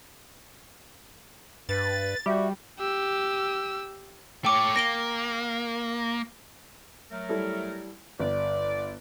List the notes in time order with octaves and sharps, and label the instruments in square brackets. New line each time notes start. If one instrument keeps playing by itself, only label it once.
[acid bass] G2 [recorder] B4 [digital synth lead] A6
[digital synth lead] G3 [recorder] F#4 [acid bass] G4 [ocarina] E5
[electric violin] G4 E6
[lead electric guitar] A3 C#5 [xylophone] G5 D6
[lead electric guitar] A#3 [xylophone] A#6 D7 G7
[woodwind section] F#3 A3 A#4
[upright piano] G3 E4 A4
[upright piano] G1 [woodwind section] D5